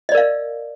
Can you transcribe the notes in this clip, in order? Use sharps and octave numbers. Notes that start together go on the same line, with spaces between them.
A#4 D5 D#5 F5